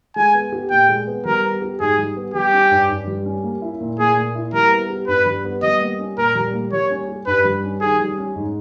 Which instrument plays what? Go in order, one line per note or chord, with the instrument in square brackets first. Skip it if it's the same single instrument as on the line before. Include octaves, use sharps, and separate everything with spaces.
[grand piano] G#3 [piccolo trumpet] G#5
[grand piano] B3
G4
[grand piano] A#2 [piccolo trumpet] G5
[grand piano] G#3
B3
[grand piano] G3 [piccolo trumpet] A#4
[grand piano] B3
G4
[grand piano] G#2 [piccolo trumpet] G#4
[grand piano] G3
B3
[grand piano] G3 [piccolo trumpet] G4
[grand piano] C#4
G2
G2
G3
C#4
A#3
E4
A#2
[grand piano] A#2 [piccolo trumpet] G#4
[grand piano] A#3
E4
[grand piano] G3 [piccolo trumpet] A#4
[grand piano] B3
G4
[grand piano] G2 [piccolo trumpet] B4
[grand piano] G3
B3
[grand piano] G3 [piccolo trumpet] D#5
[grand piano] A#3
C#4
[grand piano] A#2 [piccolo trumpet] A#4
[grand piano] G3
A#3
[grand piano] G3 [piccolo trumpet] C#5
[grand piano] C#4
G4
[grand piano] G2 [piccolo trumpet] B4
[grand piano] G3
C#4
[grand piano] D#3 [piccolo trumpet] G#4
[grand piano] G3
C#4
G#2